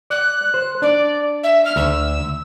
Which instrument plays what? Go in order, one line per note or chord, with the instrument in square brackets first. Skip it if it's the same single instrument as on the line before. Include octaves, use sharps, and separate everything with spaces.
[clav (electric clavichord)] D5 [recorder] F#6
[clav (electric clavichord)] C5
[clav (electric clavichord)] D4 [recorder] D5
[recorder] E5
F6
[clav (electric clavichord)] D2 [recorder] E6